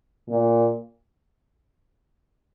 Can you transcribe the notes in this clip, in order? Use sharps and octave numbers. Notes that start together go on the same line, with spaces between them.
A#2